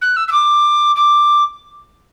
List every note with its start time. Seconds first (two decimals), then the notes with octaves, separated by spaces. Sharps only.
0.02 F#6
0.16 E6
0.28 E6
0.32 D6
0.96 D6